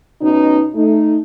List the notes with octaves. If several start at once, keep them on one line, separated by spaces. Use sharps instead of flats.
B2 C#4 D#4
A3 D#4